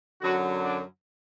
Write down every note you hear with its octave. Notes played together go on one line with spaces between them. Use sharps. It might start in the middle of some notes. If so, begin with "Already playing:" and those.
F#2 D3 F#3 F#4
D4